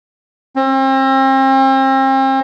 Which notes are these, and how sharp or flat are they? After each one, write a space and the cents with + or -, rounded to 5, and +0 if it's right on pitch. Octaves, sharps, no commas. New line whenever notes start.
C4 +35